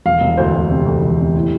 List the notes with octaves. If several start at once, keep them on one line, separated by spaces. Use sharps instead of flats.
E1 F5
E1
D2 C5
D2
C3
D2
E1
C3
A2